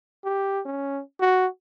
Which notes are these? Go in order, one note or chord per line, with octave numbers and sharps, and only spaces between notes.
G4
C#4
F#4